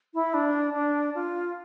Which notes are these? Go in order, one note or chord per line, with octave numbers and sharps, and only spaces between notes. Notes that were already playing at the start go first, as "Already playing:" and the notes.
E4
D4
D4
F4